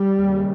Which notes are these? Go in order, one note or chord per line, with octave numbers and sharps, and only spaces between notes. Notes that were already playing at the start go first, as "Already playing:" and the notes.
Already playing: G3
D#2 C#3